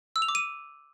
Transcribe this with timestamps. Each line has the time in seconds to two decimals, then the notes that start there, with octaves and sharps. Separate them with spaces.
0.16 E6
0.22 F7
0.29 D6
0.35 D#7